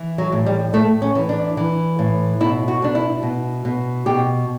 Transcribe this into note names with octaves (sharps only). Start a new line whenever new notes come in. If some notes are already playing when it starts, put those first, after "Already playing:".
Already playing: E3
F#3
A2
G3
A2 A3
C#4
E3
D4
E3
A2
B2 E4
F#4
B2 D4
E4
B2
B2
B2 G4